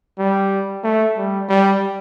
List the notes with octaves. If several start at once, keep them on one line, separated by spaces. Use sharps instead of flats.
G3
A3
G3
G3